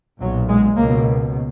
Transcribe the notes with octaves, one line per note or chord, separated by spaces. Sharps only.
B1 A#2 F#3
G#3
C#2 B2 A#3